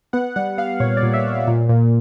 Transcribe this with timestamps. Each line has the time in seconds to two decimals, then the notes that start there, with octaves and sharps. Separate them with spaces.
0.13 B3 F#5
0.36 G3 F#5
0.58 B3 F5
0.80 A#2 C#5
0.97 D5
1.02 A#2
1.13 E5
1.25 A#2
1.47 A#2
1.69 A#2